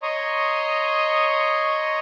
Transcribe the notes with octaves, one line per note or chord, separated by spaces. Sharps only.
C#5 D#5 A#5 C6 C#6 D#6